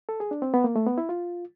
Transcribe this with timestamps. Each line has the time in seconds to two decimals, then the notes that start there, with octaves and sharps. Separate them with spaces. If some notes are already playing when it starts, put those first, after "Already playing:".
0.09 A4
0.20 G#4
0.31 D4
0.42 C4
0.54 B3
0.64 A#3
0.76 A3
0.87 B3
0.98 E4
1.09 F4